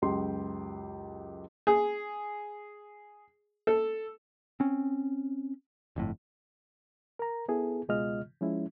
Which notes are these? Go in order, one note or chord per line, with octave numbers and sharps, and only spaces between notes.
C#2 F#2 G4 C6
G#4
A4
C4 C#4
G1 F2 A2
A#4 A#5
B3 E4 G#4 A4
C#2 B2 G#3 F4 D#5 F6
F3 G#3 C#4 E4